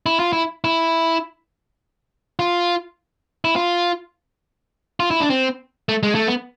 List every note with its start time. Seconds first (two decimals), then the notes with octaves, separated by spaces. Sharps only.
0.06 E4
0.19 F4
0.33 E4
0.64 E4
2.39 F4
3.45 E4
3.56 F4
5.00 F4
5.11 E4
5.20 D4
5.30 C4
5.89 A3
6.03 G#3
6.15 A3
6.28 B3